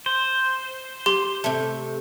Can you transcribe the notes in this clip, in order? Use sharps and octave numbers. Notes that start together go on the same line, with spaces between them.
C5
G4 C6 G7
C3 A3